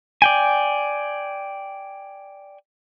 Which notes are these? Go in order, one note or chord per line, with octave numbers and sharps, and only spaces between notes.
D5 G5 G#5